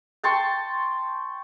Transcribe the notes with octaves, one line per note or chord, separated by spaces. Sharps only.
G5 A5 C6 C#6